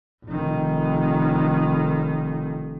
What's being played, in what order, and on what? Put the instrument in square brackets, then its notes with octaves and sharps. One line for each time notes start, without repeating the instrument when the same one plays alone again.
[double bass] F1 D#3